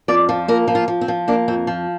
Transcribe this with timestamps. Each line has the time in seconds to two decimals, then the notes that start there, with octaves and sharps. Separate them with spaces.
0.08 F2 D5
0.29 F3
0.48 A#3 A#4
0.68 F3
0.75 F4
0.88 F3
1.01 C4
1.08 F3
1.28 A#3 D4
1.48 F2 C4
1.67 F3